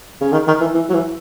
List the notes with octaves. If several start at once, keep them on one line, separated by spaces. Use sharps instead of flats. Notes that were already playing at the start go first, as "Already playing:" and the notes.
C#3
D#3
D#3
E3
E3
F#3
E3